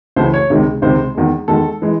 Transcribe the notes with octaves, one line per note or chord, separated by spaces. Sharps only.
C#2 C#3 E3 A3 C5
C#5
C#2 C3 D#3 G#3
C#2 C3 D#3 G#3 C5
E2 D#3 G#3
E2 D#3 G#3 A4
E3 G#3